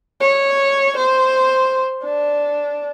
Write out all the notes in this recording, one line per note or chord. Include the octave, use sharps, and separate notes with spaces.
C#5
C5
D4